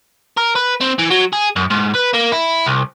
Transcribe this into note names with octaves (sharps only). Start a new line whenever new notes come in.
A#4
B4
C4
E3
F#3
G#4
F#2
G#2
B4
A#3
E4
C2